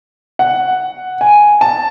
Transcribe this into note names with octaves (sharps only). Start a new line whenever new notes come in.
F#5
G#5
A5